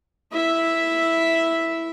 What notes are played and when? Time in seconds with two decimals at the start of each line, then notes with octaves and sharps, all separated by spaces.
0.32 E4 E5